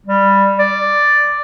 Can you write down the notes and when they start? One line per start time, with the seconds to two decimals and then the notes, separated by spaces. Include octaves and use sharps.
0.06 G3
0.59 D5